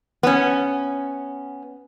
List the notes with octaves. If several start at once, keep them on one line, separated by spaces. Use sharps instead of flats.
B3 C#4